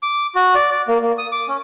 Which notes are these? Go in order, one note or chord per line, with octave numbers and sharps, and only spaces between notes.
D6
F#4
D5
D5
A#3
A#3
D#6
D6
C#4